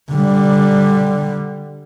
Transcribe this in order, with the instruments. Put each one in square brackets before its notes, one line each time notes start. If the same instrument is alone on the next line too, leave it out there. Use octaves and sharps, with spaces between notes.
[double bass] D3 G3